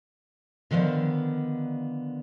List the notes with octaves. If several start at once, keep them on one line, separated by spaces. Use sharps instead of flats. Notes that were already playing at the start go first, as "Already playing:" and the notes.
D3 D#3 F3 B3 D4